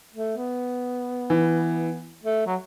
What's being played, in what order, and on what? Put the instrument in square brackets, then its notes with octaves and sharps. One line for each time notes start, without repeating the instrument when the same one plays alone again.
[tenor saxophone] A3
B3
[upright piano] E3
[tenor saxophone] A3
F#3